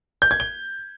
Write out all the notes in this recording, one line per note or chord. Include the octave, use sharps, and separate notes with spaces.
G6
G#6
G7